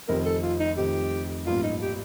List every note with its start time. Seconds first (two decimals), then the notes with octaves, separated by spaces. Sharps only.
0.08 F1 F2 D#3 G3 C4 A#4
0.26 A4
0.43 F4
0.60 D#4
0.77 F1 F2 D#3 G3 C4 G4
1.46 A1 G2 F3 A#3 F4
1.63 D#4
1.82 G4